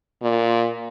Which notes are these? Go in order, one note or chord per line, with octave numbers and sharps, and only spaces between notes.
A#2